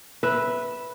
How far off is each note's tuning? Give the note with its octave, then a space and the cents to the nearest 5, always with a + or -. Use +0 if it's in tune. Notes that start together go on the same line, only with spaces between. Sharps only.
B4 -5 E5 +0